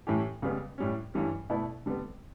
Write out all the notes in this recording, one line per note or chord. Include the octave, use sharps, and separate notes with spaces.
A2 E3 A3 C#4 G4
C#2 C#3 G3 B3
A2 G3 C#4
G2 E3 G3 C#4
B2 A3 E4 B4 D5
D3 G3 B3